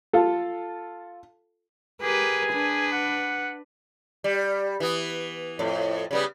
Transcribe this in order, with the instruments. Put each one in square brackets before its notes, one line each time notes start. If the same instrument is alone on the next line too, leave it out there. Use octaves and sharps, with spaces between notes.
[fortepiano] F4 A4
[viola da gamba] G4 A#4 B4 [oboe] G#4
[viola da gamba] D4 B4
[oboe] F#5
[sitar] G3
E3 B3
F2 A2
C#3 G3 B3